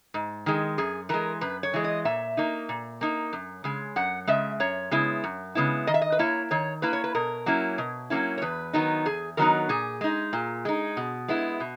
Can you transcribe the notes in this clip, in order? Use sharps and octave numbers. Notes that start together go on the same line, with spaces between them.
G#2
D#3 G#3
F#2 G#4
E3 G#3 A#4
F#2 B4
C#5
E3 G#3
D#5
A#2 E5
A#3 D#4
A#2
A#3 D#4
F#2
C#3 G#3
F#2 F#5
C#3 G#3 E5
F#2 C#5
C#3 G#3 B3 E4
F#2
C#3 G#3 B3 E4
D#3 D#5
E5
D#5
B4
A#3 E4 C#5
D#3 C#5
A#3 E4 B4
C#5
B4
B2 A#4
F#3 A#3 C#4 E4
B2
F#3 A#3 C#4 E4
C#5
E2 B4
D#3 F#3 B3 D#4
E2 G#4
D#3 F#3 B3 D#4 A#4
A#2 G#4
G#3 D#4
A#2
G#3 D#4
B2
G#3 B3 E4
B2